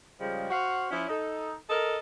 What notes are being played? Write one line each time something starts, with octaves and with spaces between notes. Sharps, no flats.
C#3 F3 G3 G#3
F#4 C5 F5 F#5
F3 C#4 E4
D#4 A4
A4 A#4 D#5